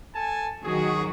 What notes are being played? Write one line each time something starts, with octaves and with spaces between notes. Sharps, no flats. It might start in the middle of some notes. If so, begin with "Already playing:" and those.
A4 G#5 A5
D#3 F#3 F#4 G#4